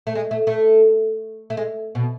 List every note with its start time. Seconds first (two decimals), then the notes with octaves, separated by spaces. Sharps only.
0.07 A3
0.15 G#3
0.31 A3
0.47 A3
1.50 A3
1.57 G#3
1.95 B2